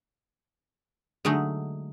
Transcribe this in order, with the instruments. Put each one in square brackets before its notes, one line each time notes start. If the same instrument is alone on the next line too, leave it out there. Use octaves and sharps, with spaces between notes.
[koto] D3 F#3 G#3 A3 D#4